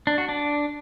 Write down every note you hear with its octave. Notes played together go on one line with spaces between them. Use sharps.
D4
F#4
D4